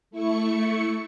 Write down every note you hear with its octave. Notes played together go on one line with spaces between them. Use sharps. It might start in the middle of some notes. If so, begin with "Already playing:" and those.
A3 E4 C#6 C#7